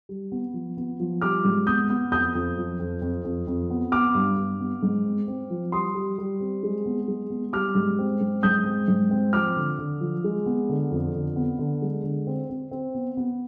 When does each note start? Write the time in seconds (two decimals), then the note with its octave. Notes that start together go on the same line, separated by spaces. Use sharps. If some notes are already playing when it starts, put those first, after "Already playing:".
0.09 G3
0.32 B3
0.54 F3
0.77 B3
1.00 F3
1.22 G3 D6 F6
1.45 G#2
1.66 B3 D#6 G6
1.90 B3
2.11 F2 D#6 G6
2.35 F2
2.57 F3
2.80 F2
3.02 F2
3.24 F2
3.47 F2
3.70 B3
3.92 B3 D6 F6
4.15 G2
4.37 G2
4.60 B3
4.83 G#2
5.05 C4
5.28 C4
5.50 F3
5.72 G3 C6 D#6
5.95 G3
6.18 G3
6.40 C4
6.63 G#3
6.86 B3
7.08 G#3
7.30 B3
7.53 G3 D6 F6
7.75 G#2
7.99 C4
8.20 G#2
8.43 G#2 D#6 G6
8.66 C4
8.88 G#2
9.11 C4
9.33 F3 D6 F6
9.56 D3
9.79 D3
10.01 F3
10.24 G#3
10.46 B3
10.69 D3
10.91 F2
11.14 D3
11.36 B3
11.59 D3
11.82 G#3
12.04 D3
12.27 C4
12.50 C4
12.71 C4
12.94 B3
13.17 B3